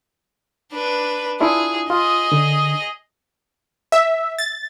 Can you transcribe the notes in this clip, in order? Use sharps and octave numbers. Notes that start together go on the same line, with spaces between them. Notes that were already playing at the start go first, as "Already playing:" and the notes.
D4 B4
D4 E4 F4 G#4
F4 G#4 D#5
D3
E5
A6